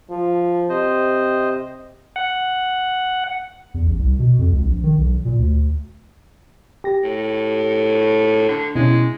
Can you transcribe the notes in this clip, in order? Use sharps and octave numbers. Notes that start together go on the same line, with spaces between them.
F3
C3 C5 D#5
F#5
E2
A1
C2
B2
F2
C#2
A#1
D#3
B1
A#2
D2
G4 A#6
A2
D3
B2 G#3 C#4 E4